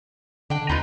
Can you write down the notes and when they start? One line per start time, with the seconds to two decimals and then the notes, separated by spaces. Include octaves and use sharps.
0.50 D3 D4 G5
0.69 D#2 D#4 F4 B4